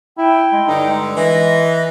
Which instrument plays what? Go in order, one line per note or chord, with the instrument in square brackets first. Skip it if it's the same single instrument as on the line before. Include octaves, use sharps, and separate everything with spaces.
[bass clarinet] E4 [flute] G5
[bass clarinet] G#3
[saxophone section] G2 D3 [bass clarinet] D#4
[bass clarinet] G#3
[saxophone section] E3 [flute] D#5